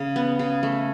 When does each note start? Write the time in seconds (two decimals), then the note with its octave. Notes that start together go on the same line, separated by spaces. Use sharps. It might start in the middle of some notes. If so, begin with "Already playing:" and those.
Already playing: C#3
0.16 B3
0.39 C#3
0.63 A3